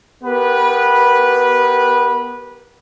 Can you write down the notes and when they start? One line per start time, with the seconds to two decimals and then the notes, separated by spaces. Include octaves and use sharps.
0.24 B3 G4 A#4 B4